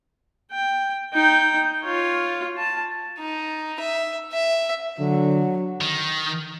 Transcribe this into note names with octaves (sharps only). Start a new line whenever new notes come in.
G5
D#4 G5
F4 C#5
A5
D#4
E5
E5
D3 F#3
D#3